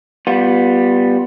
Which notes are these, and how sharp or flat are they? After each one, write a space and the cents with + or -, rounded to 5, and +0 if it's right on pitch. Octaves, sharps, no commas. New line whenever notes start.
G3 +0 B3 +0 F4 +20